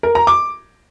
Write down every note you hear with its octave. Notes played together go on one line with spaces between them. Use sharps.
A#4
A#5
D6